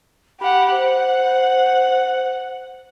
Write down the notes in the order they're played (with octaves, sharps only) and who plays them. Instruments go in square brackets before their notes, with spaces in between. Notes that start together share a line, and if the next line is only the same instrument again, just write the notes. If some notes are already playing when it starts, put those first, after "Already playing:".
[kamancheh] G4 F#5 [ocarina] B5
[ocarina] C5 [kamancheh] F#5